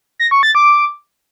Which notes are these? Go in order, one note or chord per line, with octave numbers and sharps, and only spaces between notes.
A#6
C#6
A6
D6